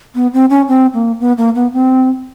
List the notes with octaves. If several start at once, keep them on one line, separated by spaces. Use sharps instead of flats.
B3
C4
C#4
C4
A#3
B3
A#3
B3
C4